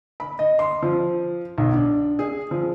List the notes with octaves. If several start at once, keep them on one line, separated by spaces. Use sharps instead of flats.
B5
D#5
C6
F3
B1
D4
G#4
F3